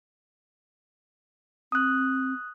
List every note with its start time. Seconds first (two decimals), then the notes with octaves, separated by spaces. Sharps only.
1.72 C4 D#6 F#6